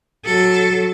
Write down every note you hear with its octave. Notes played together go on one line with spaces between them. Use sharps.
F#3 A4